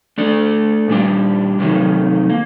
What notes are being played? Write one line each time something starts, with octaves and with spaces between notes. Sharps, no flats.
A3 D4 A4 D5
A#2 G3 D4 G4
C3 D#3 F#3 A3
A#3